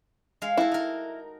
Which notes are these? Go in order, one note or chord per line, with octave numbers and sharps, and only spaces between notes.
G#3 F5
E4 F#4 A4
D#4 A#4